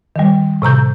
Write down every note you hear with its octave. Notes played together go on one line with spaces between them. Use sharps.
D#3 G3
A2 C3 A#5 G6